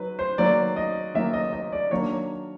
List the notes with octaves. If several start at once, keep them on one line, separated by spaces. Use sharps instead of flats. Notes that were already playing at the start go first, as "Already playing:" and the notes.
Already playing: F#3 D#4 B4
C5
D#3 F#3 A#3 D#4 D5
D#5
D#3 F#3 A#3 D#4 E5
D#5
D#5
D5
D#3 F#3 A#3 D4 C#5